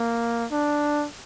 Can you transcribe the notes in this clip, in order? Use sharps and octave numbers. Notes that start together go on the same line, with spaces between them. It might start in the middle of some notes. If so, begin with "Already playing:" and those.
Already playing: A#3
D4